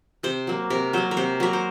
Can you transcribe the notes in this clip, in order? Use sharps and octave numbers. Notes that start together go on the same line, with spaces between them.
C3 C5
F#3 A#3
C3 A#4
F#3 A#3 C5
A#4
C3 C5
F#3 A#3 A#4
C5